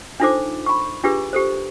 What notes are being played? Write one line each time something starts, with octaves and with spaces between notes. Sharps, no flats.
D4 D#4 F4 A4 C5 D6
B5 C#6
D4 F4 G4 G#4 B4
G4 A4 C5